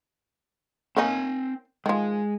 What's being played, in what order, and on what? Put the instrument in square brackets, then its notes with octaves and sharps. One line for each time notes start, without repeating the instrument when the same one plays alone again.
[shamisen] A#3 C#4 D#4 [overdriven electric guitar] C4 G#5
[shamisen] D#3 F3 [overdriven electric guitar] G#3